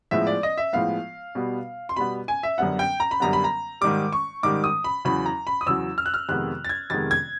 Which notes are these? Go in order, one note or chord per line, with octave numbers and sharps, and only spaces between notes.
A2 F3 G#3 B3 E5
D5
D#5
E5
A2 F3 G#3 B3 F5
B2 G3 B3
C6
B2 G3 B3 B5
G#5
E5
F#2 D3 G3 B3 F#5
G5
A#5
B5
F#2 D3 G3 B3 A#5
B5
A#5
G#2 D#3 G3 D6
C#6
G#2 D#3 G3 D6
D#6
B5
E2 C#3 F#3 B5
A#5
B5
D#6
E2 C#3 F#3 E6
F6
F#6
F6
F2 C3 D#3 G#3 B3 F#6
A6
G#6
F2 C3 D#3 G#3 B3 A6
G#6